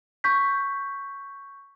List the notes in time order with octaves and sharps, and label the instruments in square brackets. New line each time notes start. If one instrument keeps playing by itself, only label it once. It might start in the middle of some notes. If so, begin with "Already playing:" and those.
[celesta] C#6 G6 B6